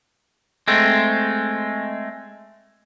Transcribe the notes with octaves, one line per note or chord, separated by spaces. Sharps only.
G#3 A3 C4